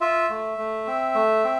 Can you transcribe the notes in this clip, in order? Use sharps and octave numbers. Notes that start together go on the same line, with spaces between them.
F4 E5
A3
A3
C4
A3
C4